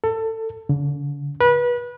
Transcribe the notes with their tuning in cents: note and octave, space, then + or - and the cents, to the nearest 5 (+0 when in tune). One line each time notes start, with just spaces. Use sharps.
A4 +25
D3 -45
B4 -25